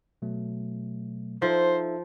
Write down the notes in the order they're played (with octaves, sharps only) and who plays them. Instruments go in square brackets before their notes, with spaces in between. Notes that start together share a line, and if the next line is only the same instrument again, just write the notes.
[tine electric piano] B2 F#3 A3
[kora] F3 [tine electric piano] D#4 A4 E5 [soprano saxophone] C5